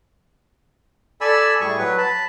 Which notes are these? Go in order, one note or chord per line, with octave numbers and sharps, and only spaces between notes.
A4 D5 G#5 B5 E6
A2 G3 G#4 C#6
F#3 B4
A5 B5